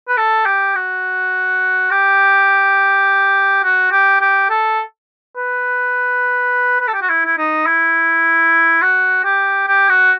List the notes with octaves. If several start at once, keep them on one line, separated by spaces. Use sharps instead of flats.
B4
A4
G4
F#4
G4
F#4
G4
G4
A4
B4
B4
A4
G4
F#4
E4
E4
D#4
E4
F#4
G4
G4
F#4